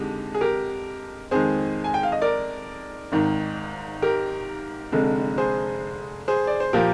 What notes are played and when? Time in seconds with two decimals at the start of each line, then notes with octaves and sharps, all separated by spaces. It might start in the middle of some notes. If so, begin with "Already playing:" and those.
Already playing: F2 D3 G#3 D#4 G4
0.34 G#4
0.41 G4 A#4
1.31 F2 D#3 G#3 G#4 C5
1.84 G#5
1.94 G5
2.03 F5
2.12 D#5
2.22 A#4 D5
3.12 G#1 G#2 D#3
4.02 G4 A#4
4.92 F1 F2 D3 G#3
5.38 G#4 C5
6.28 G#4 C5
6.47 D5
6.60 C5
6.73 A#2 F3 A#3 G4 A#4